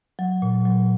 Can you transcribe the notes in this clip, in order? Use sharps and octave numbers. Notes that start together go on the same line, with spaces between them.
F#3
A#2
F#3